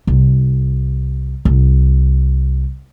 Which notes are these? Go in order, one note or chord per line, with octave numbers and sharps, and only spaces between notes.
C2
C2